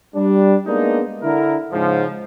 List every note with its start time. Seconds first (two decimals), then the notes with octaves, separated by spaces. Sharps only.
0.15 G3 D4
0.66 G#3 A#3 B3 D4 D#4
1.22 D3 E4 A#4
1.72 G#2 C#3 F3